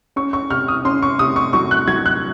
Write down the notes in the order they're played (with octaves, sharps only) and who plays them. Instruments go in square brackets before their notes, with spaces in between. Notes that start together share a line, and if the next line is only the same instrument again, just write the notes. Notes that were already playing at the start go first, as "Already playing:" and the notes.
[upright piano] C#4 C#6
C#6
C3 F6
D#6
C#4 C6
C#6
C3 D#6
C#6
F#3 C#6
F#6
F#3 G#6
F#6